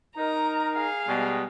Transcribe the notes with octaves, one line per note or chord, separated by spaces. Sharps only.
D#4 A#4 A#5
G#4 F5
B2 G3 G#3